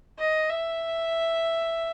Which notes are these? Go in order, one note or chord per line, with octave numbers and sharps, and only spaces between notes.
D#5
E5